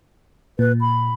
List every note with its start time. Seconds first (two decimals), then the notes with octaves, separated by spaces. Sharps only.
0.59 A#2 B4
0.81 B5